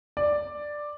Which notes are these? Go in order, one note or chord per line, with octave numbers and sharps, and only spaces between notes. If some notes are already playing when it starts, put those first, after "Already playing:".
D5